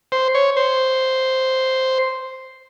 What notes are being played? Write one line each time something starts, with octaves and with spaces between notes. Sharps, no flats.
C5
C#5
C5